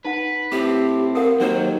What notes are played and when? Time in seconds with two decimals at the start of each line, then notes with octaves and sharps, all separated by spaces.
0.05 D#4 B4 F#5
0.52 A2 C4 G4
1.15 A4 A#4 F5 F#5
1.40 D#2 F#3 C5 F#5